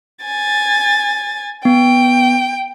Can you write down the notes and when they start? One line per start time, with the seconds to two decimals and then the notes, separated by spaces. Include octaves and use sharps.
0.25 G#5 A6
1.65 B3 G5